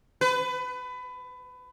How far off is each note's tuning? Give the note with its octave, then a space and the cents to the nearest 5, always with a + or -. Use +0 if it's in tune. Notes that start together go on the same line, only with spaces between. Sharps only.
B4 +25